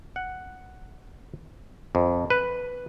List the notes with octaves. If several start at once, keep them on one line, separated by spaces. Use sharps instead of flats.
F#5
F2
B4